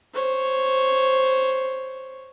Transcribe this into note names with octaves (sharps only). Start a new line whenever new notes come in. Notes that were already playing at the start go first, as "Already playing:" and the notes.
C5 C#5